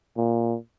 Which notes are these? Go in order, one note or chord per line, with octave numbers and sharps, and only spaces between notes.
A#2